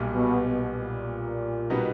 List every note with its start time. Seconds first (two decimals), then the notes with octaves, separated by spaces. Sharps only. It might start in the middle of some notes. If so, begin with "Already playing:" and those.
Already playing: B1 A#2 G3
0.14 B2
0.46 B2
0.77 A#2
1.70 B2 G3 B3 D#4